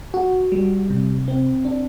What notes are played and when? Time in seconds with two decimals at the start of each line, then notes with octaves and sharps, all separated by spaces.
0.14 F#4
0.52 G3
0.90 C3
1.28 C4
1.65 D4